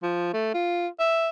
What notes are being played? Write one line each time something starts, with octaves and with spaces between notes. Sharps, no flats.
F3
A3
F4
E5